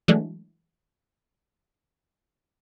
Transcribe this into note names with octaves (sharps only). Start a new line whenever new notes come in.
E3 F#3 G#3 A3 D4